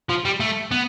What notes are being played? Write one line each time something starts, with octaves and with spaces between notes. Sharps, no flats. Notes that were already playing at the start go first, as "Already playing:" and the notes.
F3
G3
A3
B3